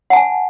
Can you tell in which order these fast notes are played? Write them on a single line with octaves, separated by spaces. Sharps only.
F#5 A5 G#5